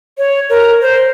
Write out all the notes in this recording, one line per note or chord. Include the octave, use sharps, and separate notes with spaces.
C#5
A#4
C5